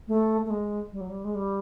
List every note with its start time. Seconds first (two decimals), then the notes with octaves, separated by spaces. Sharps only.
0.08 A3
0.45 A3
0.50 G#3
0.92 G3
1.00 F#3
1.09 G3
1.24 G#3
1.34 G3